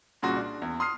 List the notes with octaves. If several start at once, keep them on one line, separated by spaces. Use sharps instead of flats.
C2 A#2 C#3 F#4 C6
D4
E2
C6 D#6 F6 C7